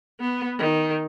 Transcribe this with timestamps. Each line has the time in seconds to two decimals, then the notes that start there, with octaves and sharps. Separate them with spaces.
0.20 B3
0.59 D#3